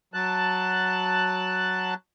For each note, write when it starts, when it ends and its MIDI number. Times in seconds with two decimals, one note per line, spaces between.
0.14 1.94 54
0.14 1.94 81
0.14 1.94 90